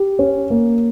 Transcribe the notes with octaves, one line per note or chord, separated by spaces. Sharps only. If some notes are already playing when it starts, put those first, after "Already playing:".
Already playing: G4
C#4
A#3